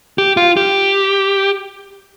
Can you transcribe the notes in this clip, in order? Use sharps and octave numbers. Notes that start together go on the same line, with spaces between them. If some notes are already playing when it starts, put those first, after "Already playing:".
G4
F4
G4